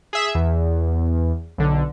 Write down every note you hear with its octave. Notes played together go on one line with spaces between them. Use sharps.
G#4 E5
E2
B1 D3